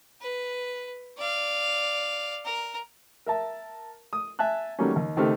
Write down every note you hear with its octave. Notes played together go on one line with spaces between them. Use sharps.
B4
D5 F5
A#4
A#4 E5 A5
D#6
E5 G#5 A5 F#6
D#3 F#3 G3 A3 A#3 C#4
D#2
C#2 D#3 A3 C4 G4 F6